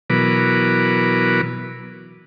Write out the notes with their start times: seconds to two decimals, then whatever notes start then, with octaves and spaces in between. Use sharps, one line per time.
0.10 B2 E3 F#3 A#4 B4 D6